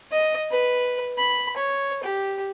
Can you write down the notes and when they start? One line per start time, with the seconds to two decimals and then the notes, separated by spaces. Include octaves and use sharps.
0.12 D#5
0.51 B4
1.18 B5
1.56 C#5
2.03 G4